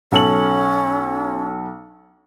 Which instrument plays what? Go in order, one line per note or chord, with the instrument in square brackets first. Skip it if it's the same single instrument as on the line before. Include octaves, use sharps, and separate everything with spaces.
[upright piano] B1 A4 F#7 [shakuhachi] C#4